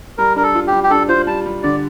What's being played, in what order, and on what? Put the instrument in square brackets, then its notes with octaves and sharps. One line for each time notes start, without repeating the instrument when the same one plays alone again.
[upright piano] G3 [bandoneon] A#4
[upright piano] D4 [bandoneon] A#4
[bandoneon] A4
[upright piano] F4
[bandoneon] G4
[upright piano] G3
[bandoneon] G4
[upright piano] D4 [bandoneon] A4
[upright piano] F4 [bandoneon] C5
[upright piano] G3 [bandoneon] A5
[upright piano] G3
[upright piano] D3 [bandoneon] D5